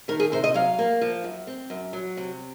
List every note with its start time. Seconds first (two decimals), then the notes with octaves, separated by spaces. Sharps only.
0.08 D#3 A#4
0.20 G#4
0.32 C3 C5
0.44 D#5
0.54 F#3 F5
0.79 A#3
1.01 F3
1.24 F#2
1.47 C4
1.70 F#2
1.93 F#3
2.17 C3